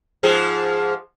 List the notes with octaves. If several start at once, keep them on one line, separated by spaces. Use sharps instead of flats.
G#2 F3 G#4